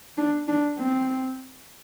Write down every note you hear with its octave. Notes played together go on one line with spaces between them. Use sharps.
D4
D4
C4